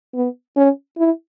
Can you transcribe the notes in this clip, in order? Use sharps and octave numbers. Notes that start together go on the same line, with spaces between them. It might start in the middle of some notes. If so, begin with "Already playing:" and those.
B3
C#4
E4